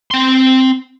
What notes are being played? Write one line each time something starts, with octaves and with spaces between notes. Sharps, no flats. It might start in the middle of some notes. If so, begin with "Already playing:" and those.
C4 C6